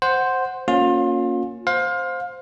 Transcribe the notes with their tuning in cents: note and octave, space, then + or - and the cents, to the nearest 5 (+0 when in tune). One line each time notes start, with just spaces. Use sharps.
C5 +0 F#5 +0
A#3 +0 C#4 +0 F4 +30
C5 +0 F5 +25